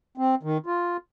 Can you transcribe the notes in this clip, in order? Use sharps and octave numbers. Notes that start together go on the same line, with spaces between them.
C4
D#3
F4